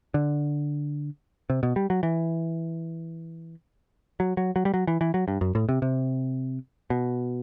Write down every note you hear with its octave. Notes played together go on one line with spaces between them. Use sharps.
D3
C3
B2
G3
F#3
E3
F#3
F#3
F#3
G3
F#3
E3
E3
F#3
G2
F#2
A2
C3
C3
B2